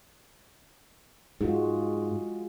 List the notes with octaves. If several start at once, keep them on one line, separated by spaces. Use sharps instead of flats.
G#2 G#3 F4 F#4